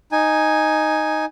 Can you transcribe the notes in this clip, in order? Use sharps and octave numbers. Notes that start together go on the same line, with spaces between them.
D#4 G#5